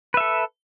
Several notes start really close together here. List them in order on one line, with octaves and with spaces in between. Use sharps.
B4 E5 A4